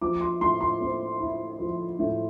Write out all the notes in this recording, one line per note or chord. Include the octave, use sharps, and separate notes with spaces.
F3 D6
C6
A2 C6
C6
C4
E4
F3
A2